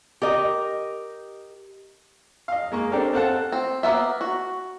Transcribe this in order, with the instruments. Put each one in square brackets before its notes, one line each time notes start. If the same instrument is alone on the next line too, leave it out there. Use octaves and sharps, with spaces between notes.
[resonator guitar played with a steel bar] G4 A#4 D#5
[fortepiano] D#5 F5
G#3 A#3 C#6
C4 D4 G4 A4 A#4
C4 A4 F5 F#5 A5
[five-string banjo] C4
A#3 B3 E5
F#4